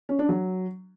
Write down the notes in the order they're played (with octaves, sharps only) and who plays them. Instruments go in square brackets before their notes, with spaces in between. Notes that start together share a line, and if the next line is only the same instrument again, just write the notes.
[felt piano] C#4
D4
F#3